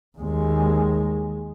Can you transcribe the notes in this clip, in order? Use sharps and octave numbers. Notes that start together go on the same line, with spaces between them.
D#2 G#3